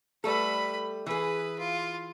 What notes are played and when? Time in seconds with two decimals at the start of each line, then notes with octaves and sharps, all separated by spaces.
0.24 G3 A3 A4 B4 B5
1.06 E3 G#4 B4
1.59 F4